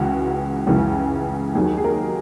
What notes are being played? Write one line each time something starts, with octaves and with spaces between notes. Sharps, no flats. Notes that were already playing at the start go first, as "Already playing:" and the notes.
Already playing: C#2 C#3 E3 F#4
C#2 C#3 E3
D#2 D#3 F#3 G#4
G#4
A#4